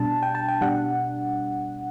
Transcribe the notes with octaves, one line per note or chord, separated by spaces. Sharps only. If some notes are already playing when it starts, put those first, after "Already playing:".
Already playing: B2 G3 D4 A5
G5
A5
G5
B2 G3 D4 F#5